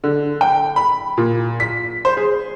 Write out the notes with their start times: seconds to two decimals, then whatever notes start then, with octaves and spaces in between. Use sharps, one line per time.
0.04 D3
0.41 G5
0.76 B5
1.18 A#2
1.60 B6
2.05 C5
2.17 G#4